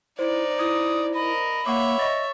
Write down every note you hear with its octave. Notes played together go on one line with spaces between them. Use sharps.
D#4 E4 C5 D5
E4 D#6
A#4 D#5 B5
A#3 C#5 E5 F#5 C#6 D6
D#5 C#6 A6